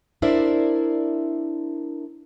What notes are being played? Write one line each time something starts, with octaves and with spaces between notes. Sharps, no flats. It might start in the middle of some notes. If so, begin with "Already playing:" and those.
D4 E4 A#4 C5 D5 E5